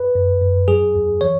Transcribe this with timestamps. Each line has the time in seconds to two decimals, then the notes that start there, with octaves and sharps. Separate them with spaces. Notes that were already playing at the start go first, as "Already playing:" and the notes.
Already playing: B4
0.15 F#2
0.42 F#2
0.68 F#3 G#4
0.95 E2
1.21 E3 C#5